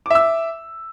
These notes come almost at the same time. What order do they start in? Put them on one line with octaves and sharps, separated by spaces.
D6 E5 E6